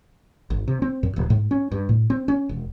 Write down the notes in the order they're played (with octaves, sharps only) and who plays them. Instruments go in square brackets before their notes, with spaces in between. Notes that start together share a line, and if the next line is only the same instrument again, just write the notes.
[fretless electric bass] G1
C3
C4
F#2
D#1
G#2
C#4
G2
A2
C4
C#4
E1